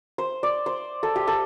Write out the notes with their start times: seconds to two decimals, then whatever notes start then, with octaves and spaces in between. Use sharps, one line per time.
0.18 C5
0.43 D5
0.66 C5
1.03 A4
1.16 G4
1.27 A4